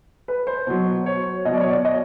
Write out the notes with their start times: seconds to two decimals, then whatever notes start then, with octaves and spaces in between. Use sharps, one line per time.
0.28 B4
0.47 C5
0.67 B2 F#3
1.06 C#5
1.45 B2 D#5
1.49 F#3 D5
1.61 C#5
1.69 D5
1.85 D#5